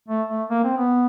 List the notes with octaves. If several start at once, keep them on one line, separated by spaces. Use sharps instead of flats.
A3
A3
A#3
C4
B3